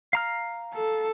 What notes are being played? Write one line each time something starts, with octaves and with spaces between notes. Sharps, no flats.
F5 A#5 F6
A4